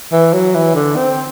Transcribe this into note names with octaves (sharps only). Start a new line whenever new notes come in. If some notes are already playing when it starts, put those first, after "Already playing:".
E3
F#3
E3
D3
C4